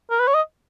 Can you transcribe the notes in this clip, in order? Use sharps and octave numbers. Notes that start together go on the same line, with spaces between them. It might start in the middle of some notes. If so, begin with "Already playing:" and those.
A#4
B4
C#5
D#5